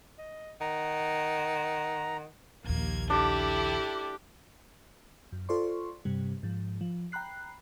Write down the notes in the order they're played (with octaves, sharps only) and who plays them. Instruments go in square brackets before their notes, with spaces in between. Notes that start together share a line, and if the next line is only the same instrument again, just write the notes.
[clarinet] D#5
[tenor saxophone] D#3 [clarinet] F#5 [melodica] A#5
[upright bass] A#1 D#2 [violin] A#3 G#6
[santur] D4 [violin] E4 A4 [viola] G4
[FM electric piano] F#2
F4 A4 C5 D5 C6 C#6
G2 C3 G3
G#2 F3
F3
G5 A#5 B5 F#6 C7